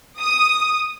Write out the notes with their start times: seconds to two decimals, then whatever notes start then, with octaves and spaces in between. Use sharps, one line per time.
0.19 D#6